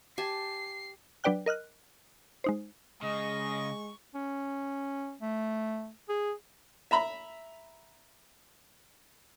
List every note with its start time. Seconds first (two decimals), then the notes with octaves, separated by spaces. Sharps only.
0.18 G4 G#5 A5 C7
1.24 F#3 D4 B4 D5 G5 F#6
1.46 A#4 D#5 F6 F#6
2.44 G#3 D#4 C5
3.02 C#3 G#3 D#5 C#6
4.15 C#4
5.21 A3
6.09 G#4
6.91 E5 A#5 B5